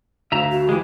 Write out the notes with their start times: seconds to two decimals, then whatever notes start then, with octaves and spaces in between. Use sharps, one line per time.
0.32 D2 E5 F5 A#5
0.51 F#4
0.69 E3 G#3 G4